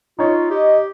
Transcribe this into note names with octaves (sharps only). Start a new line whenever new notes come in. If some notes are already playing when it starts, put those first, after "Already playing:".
D#4 F4 C#5
G4 D#5